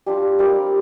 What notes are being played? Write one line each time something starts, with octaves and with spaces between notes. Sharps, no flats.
G3 D4 F4 G4
G3 C4 F4 A#4